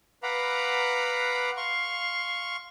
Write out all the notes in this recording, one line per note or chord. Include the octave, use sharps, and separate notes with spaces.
B4 F5 F#5 A#5 B5 D6
F5 C6 C#6